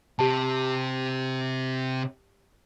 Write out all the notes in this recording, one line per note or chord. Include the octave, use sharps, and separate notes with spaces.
C3 G4 A5